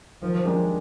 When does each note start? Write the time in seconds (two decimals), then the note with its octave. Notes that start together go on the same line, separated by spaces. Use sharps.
0.22 D#3 F3
0.45 G#3 D4 G4 A#4